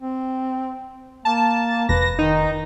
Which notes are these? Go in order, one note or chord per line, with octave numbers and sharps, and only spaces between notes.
C4
A#3 A5
F1 B4 A#6
D#3 D#4